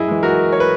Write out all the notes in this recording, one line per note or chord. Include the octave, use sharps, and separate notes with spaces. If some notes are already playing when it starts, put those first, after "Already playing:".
Already playing: F#2 E4 G#4 D#5
E3 G#3
F#4 A#4
C#5
B4